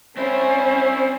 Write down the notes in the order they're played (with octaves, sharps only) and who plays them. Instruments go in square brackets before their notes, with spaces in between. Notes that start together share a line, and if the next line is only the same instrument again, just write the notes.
[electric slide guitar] C4 E4 [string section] C#4 [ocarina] C5